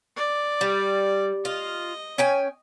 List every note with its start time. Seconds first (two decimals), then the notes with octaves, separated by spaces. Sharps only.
0.17 D5
0.61 G3
1.45 F4 D#5
2.18 C#4 G5 G#5